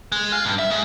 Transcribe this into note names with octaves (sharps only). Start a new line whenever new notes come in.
G#3
F4
G2
E5
G#2